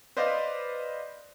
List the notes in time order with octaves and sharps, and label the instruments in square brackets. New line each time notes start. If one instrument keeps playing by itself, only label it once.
[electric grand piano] B4 C5 D5 D#5 F5